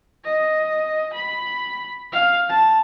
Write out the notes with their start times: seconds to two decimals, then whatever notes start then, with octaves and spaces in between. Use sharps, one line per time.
0.24 D#5
1.13 B5
2.12 F5
2.49 A5